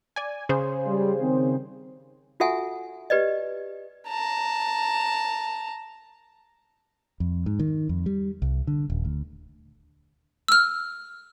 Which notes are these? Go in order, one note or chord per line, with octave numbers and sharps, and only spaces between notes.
D5 G#5
C#3 G#4 C5
G3
D#3 C4
F4 F#4 A4 E5 F#5 G#5
G4 B4 D5 D#5
A5 A#5
F2
G#2
D#3
F2
G3
C2
D3
D#1
D2
E6 F6